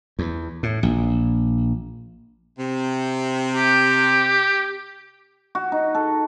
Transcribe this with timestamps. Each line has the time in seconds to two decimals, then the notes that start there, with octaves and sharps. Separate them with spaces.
0.19 E2
0.63 A2
0.83 A#1
2.58 C3
3.52 G4
5.55 F#4
5.72 D#4
5.95 A4